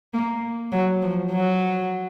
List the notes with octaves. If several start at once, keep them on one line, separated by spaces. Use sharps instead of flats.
A#3
F#3
F3
F#3